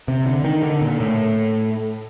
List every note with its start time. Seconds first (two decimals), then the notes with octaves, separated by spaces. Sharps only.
0.08 C3
0.26 D3
0.44 D#3
0.63 D3
0.82 A#2
1.00 A2